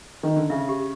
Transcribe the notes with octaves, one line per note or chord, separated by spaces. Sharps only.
D#3
D3
C#3 E5
G4